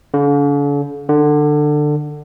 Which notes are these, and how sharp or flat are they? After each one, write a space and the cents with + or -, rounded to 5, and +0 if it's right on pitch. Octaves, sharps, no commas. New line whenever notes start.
D3 -45
D3 +20